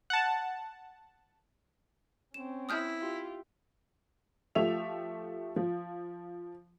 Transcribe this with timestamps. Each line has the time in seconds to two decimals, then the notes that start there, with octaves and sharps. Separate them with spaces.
0.10 F#5 A5
2.34 C4 C#4 E7
2.69 E4 D#6 F6 G6
3.01 F4 G4
4.55 F3 A3 G4 E5 F7
5.56 F3